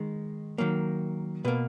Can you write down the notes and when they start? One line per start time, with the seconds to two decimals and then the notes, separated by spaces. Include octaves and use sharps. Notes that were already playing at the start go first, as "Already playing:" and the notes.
Already playing: D#3 G#3
0.58 D#3 F#3 A#3
1.45 B2 A#3 B4